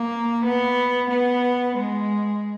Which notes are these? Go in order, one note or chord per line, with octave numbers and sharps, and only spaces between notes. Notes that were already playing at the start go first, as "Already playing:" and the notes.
Already playing: A#3
B3
B3
G#3